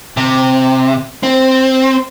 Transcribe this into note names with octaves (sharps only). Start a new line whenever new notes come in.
C3
C4